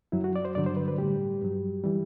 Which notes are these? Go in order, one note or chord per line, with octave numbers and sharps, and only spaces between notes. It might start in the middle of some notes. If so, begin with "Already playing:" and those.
F#2 F#3 E4
F#4
D5
C5
G2 D3 F#3 D5
C5
B4
B4
A2 G3 G4
G2 F#3
E3 G3